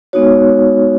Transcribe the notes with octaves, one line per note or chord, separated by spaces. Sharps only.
G#3 B3 D#4 F#4 C#5